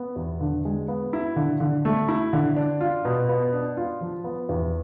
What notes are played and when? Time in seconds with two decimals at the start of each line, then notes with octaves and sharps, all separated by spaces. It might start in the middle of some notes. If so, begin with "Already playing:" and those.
Already playing: B3
0.16 E2
0.41 D3
0.65 G#3
0.88 B3
1.13 E4
1.36 D3
1.60 D3
1.85 A3
2.08 E4
2.33 D3
2.56 D4
2.81 F4
3.05 B2
3.29 B3
3.53 D4
3.77 F4
4.01 F3
4.24 B3
4.49 E2